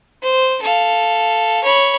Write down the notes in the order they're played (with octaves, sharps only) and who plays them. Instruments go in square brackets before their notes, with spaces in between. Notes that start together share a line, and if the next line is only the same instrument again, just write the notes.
[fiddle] C5
A4 F5
C#5 B5